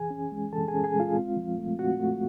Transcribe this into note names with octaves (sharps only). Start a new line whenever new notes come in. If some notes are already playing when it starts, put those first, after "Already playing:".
Already playing: E3 G#4 G#5
C#4
G#3
E3 A4 A5
G#4 G#5
C#4
G#4 G#5
G#3
F4 F5
C4
F3
A3
C4 F#4 F#5
A3